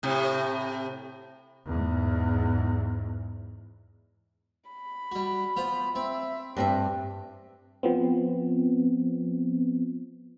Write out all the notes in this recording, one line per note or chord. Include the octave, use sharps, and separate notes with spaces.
A2 C3
E2 G#2
B5
G3 F#4
B3 F4 C5
C4 E5
G2 C4 D4 E5
F3 B3 C4